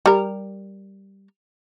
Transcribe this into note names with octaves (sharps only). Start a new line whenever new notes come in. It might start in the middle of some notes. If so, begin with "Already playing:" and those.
G3 A#4